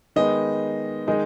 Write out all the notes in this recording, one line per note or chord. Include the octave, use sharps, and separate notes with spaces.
D#3 G#3 B3 D#4 D#5
D#3 G#3 D#4